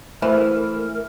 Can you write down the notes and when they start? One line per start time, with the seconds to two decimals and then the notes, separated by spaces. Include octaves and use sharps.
0.22 E3 A3 A#4 C5